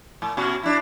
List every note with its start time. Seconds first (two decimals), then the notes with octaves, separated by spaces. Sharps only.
0.22 A2
0.37 B2 C#4 F#4
0.63 D4 E4